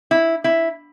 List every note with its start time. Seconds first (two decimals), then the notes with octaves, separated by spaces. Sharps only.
0.11 E4
0.44 E4